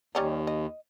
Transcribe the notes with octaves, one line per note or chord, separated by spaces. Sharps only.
D#2 G3 C#4 D#4
D#5